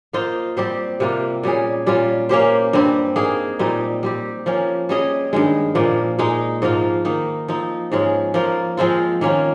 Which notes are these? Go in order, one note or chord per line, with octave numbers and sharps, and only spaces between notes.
A#3 F4 C5 D#5
G3 C4 G4 C5
C3 G3 A#3 F4
A#2 G3 C#4 G#4
A#2 G3 C#4 F4
A#3 C#4 G4 C5
G2 G3 C4
A#3 D#4 G#4
A#2 G3 C4 D#4
G3 C4 G4
F3 A#3 C#4
G3 C#4 G#4 D#5
G2 D#3 G#3
A#2 F3 A#3
A#2 G#3 D#4
G#2 F3 A#3 F4
D#3 A#3 D#4
F3 C4 D#4
G#2 F3 G#3 C#4
F3 A#3 F4 A#4
F3 G#3 C4 F4
D#3 A#3 C#4 F4